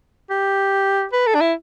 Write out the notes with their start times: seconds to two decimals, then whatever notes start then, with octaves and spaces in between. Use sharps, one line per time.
0.30 G4
1.13 B4
1.27 A4
1.35 D4
1.41 E4